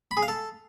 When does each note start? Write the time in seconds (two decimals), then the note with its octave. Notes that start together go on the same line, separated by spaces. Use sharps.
0.11 B5
0.17 G#4
0.23 F5
0.28 A4